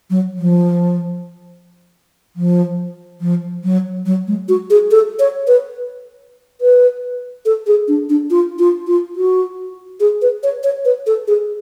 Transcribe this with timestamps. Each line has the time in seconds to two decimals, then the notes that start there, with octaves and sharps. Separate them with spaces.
0.10 F#3
0.38 F3
2.36 F3
3.21 F3
3.64 F#3
4.06 F#3
4.28 G#3
4.49 F#4
4.70 G#4
4.91 A4
5.19 C#5
5.48 B4
6.61 B4
7.46 A4
7.67 G#4
7.88 D4
8.10 D4
8.31 F4
8.59 F4
8.87 F4
9.16 F#4
10.00 G#4
10.22 B4
10.43 C#5
10.64 C#5
10.85 B4
11.07 A4
11.28 G#4